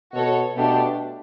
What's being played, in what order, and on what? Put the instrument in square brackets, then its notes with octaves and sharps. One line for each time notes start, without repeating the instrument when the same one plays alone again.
[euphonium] B2 [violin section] F#4 A4 C#5
[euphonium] B2 [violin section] A3 D4 G4